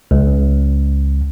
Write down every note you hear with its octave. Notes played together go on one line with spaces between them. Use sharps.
C#2